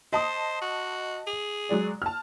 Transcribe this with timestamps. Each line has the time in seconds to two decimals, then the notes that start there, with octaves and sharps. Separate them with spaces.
0.13 C5 D#5 A5 D#6
0.61 F#4
1.27 G#4
1.69 F#3 G#3 D5
2.02 A5 F6